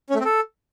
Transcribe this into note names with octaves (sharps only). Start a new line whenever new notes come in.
C#4
A3
C4
A4